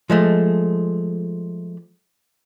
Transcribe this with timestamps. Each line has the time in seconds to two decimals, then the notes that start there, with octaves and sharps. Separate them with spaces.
0.10 F3 G#3 A3